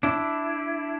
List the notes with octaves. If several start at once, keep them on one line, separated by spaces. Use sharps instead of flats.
D4 E4